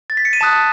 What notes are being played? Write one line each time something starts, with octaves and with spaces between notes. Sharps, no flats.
A6
B6
C#7
D#7
A5 D#6 F#6 E7